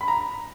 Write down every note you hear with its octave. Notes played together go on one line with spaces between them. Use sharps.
B5
A#5